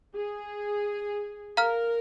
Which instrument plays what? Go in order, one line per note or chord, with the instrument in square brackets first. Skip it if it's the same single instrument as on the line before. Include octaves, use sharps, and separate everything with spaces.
[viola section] G#4
[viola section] A#4 [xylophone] F5 A#5 F6